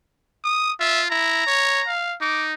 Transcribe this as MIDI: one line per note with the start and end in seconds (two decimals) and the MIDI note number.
0.44 0.72 87
0.80 1.10 65
0.80 1.02 76
1.10 1.42 64
1.10 1.90 82
1.46 1.81 73
1.87 2.15 77
2.21 2.54 63
2.21 2.46 86